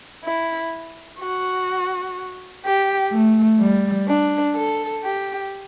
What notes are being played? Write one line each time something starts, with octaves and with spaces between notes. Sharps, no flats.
E4
F#4
G4
A3
G3
D4
A4
G4